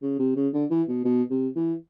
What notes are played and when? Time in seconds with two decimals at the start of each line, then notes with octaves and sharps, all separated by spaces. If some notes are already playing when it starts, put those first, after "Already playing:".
0.02 C#3
0.19 C3
0.36 C#3
0.53 D3
0.71 E3
0.88 B2
1.05 B2
1.30 C3
1.56 E3